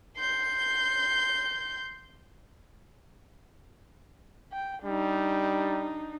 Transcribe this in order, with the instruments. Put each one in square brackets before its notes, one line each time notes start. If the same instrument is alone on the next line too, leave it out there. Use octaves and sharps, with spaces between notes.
[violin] C6 G6
[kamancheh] G5
[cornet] G3 [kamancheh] D4 D#4